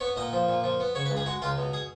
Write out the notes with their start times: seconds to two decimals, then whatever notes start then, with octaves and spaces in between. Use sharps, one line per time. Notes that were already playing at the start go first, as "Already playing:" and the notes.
0.01 B3 C#5
0.17 A#2 D#5
0.33 F3
0.49 A#2
0.64 F3
0.80 B3
0.95 C#3 C#5
1.06 B4
1.10 C#2
1.17 G#4
1.26 G#3 F#4
1.42 C#2 F4
1.58 B2
1.73 G#4